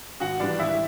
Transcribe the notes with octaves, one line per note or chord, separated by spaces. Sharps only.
G#1 F#4 F#5
G2 E3 G3 D4 D5
G#1 E4 E5